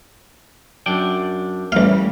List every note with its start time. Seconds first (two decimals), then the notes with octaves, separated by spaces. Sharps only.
0.86 F#2 D4 G5
1.72 A1 E3 G3 A3 F5